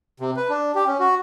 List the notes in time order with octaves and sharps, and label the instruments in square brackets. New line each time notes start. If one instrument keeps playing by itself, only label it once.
[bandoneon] C3
B4
D4
G4
C#4
F#4